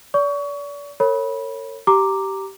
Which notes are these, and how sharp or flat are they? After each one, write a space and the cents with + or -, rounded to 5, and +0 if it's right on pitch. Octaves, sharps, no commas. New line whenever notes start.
D5 -35 C#6 +30
A#4 -45 C#5 -15 B5 -15
G4 -15 A#5 -5 D6 +0